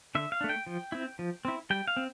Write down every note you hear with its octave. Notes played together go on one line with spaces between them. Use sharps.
D3 E5
F5
A3 D4
G5
F3
C4 E4
F3
C4 E4
G3 G5
F5
C4